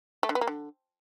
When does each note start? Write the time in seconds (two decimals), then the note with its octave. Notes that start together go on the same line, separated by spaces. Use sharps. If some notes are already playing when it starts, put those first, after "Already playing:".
0.23 A3
0.29 D3
0.35 B3
0.41 A#3
0.47 D3